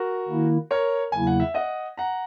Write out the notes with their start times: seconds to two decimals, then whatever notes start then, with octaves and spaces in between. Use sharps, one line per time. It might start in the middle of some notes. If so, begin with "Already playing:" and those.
Already playing: F#4 A#4
0.28 D#3 A#3 E4
0.71 A#4 C#5
1.12 E2 C#3 F#3 A#3 E4 G#5
1.27 F#5
1.40 E5
1.54 D#5 F#5
1.97 F#5 A#5